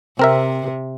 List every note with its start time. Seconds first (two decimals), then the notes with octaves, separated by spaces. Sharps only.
0.19 C3 C4 A#4 E5